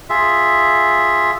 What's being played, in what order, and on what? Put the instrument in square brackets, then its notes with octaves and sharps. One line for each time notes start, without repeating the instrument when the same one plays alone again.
[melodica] F4 G#4 E5